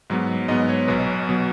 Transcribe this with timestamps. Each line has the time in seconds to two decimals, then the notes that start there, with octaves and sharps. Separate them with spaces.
0.10 G#2 F#3 B3
0.48 G#2 F#3 B3 D#5
0.69 C#5
0.88 B1 B2 F#3 B4
1.29 B2 F#3